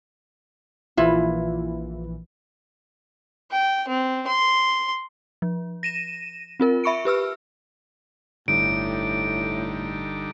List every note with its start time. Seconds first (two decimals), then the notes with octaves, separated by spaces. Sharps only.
0.97 A#1 E3 E4 F4
3.51 G5
3.88 C4
4.27 C6
5.42 F3
5.83 A#6 D#7 E7
6.60 C4 F4 A#4
6.84 E5 B5 C#6 C#7 D7
7.05 G4 B4 E6 F6
8.48 G1 A2 D3 G3 D#4 D7